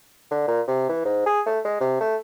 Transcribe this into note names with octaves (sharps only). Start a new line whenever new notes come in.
D3
A#2
C3
E3
G#2
G#4
A3
G#3
C3
A3